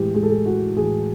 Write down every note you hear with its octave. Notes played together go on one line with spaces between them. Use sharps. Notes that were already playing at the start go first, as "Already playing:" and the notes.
Already playing: A2 E3 G#3 G4
A2 E3 G#3 G#4
A4
G#4
F#4
A2 E3 G#3 G#4